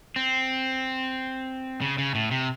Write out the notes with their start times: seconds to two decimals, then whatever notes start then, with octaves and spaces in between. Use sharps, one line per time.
0.16 C4
1.81 C#3
1.98 C#3
2.15 A2
2.31 C3